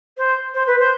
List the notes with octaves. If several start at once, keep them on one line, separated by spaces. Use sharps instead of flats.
C5
C5
B4
C5